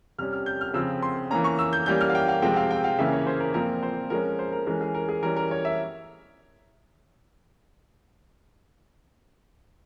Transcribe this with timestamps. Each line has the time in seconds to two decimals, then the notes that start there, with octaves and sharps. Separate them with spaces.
0.18 C3 G3 C#4 F6
0.32 F6
0.46 G6
0.61 F6
0.74 C#3 F3 C4 E6
1.02 C6
1.31 E3 A#3 C#4 A#5
1.44 C#6
1.59 E6
1.73 G6
1.86 E3 G3 A#3 C#4 G6
2.01 F6
2.09 F5
2.15 G5
2.28 F5
2.42 C3 F3 G#3 C4 G5
2.56 F5
2.71 G5
2.84 F5
2.98 C#3 E3 A#3 C#4 E5
3.13 C#5
3.27 C5
3.40 A#4
3.54 A#2 F3 C4 A#4
3.83 C5
4.10 F3 G#3 C#4 A#4
4.39 C5
4.52 A#4
4.66 E3 G#3 C#4 A#4
4.81 G#4
4.94 A#4
5.09 G#4
5.23 E3 G3 C#4 A#4
5.37 A#4
5.51 C#5
5.65 E5